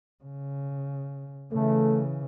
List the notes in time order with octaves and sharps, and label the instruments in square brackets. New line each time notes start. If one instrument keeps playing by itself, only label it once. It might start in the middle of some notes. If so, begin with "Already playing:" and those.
[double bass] C#3
[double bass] C#3 E3 [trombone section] A3